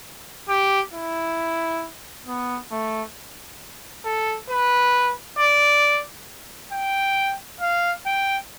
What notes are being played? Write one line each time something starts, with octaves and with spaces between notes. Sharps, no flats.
G4
E4
B3
A3
A4
B4
D5
G5
F5
G5